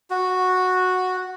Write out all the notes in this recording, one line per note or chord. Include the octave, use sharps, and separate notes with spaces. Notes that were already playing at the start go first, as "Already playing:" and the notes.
F#4